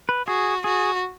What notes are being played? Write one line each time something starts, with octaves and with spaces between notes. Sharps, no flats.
B4
F#4 G#4
F#4 G#4